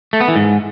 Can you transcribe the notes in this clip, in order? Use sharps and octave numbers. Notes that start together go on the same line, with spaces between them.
A3
B3
E3
G#2